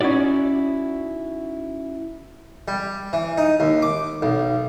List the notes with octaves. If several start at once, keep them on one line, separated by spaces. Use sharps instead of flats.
C#4 D#4 E4 F#4 D5
G3
E3
D#4
D#2
D6
B1